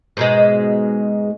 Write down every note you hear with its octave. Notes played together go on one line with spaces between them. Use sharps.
G#2 B2 G#3